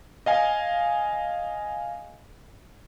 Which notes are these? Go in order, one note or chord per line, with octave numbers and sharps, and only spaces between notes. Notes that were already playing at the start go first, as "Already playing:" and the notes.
D#5 F5 G#5